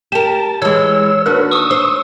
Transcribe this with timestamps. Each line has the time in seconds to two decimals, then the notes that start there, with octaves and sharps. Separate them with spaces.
0.12 G4 A#4 A5
0.62 E3 G#3 C#5 E6
1.26 D#2 D4 F#4 A#4 B4
1.52 C#6 D#6 E6
1.71 C5